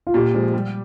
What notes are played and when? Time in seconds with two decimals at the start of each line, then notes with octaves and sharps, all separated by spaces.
0.07 F4
0.14 A#2 G4
0.34 F3 G#3
0.54 G3